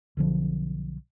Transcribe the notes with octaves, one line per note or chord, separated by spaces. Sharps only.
B1 D3 F3